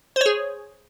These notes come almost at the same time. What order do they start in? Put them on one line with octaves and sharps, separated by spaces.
C5 C#5 G#4